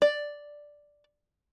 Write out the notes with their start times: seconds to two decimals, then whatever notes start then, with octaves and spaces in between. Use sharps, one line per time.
0.02 D5